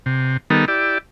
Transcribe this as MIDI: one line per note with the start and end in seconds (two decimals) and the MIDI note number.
0.06 0.37 48
0.50 0.65 51
0.50 0.65 55
0.50 0.65 59
0.50 0.65 63
0.50 0.65 69
0.50 0.65 70
0.68 0.98 64
0.68 0.98 67
0.68 0.98 74